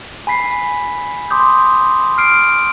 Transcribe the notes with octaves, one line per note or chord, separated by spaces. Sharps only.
G#5 B5 B6 C7
C6 D6 D#6 G6
F6 C7 D7